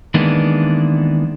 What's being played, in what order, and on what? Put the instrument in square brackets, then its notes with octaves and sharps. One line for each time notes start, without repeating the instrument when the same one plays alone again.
[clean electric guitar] D#3 E3 G#3 A#3 B3 D4